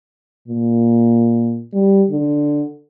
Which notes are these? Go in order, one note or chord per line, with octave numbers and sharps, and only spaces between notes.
A#2
G3
D3